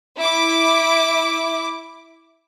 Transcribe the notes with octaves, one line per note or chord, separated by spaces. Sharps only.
E4 D6